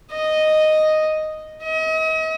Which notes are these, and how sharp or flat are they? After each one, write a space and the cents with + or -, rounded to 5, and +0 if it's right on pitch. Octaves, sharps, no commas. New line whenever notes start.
D#5 -5
D#5 +40